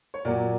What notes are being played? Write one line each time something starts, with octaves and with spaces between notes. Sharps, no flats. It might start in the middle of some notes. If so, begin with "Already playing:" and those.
C#5
A#2 F#3 A#3 D5